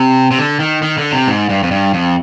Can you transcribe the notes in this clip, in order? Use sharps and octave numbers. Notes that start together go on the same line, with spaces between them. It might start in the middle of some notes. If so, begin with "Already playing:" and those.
Already playing: C3
C3
D3
D#3
D#3
D3
C3
G#2
G2
F2
G2
F2